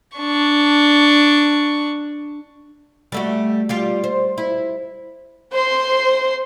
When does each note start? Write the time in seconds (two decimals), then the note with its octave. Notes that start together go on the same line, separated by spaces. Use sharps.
0.17 D4 C#6
3.12 G3 A3 F#4
3.69 G3 F4 G4
4.04 C5
4.38 E4
5.53 C5 C6